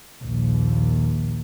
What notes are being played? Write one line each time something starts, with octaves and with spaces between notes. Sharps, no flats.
A#1 D#2